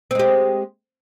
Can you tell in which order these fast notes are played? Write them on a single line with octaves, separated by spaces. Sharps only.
C4 G#3 G4